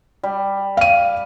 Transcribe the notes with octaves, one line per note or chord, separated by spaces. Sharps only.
G3
F5 D#7